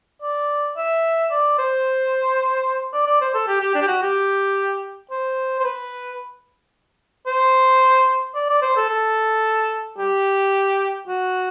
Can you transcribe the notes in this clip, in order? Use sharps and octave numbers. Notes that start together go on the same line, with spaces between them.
D5
E5
D5
C5
D5
D5
C5
A4
G4
G4
D4
G4
F#4
G4
C5
C5
B4
C5
D5
D5
C5
A4
A4
G4
F#4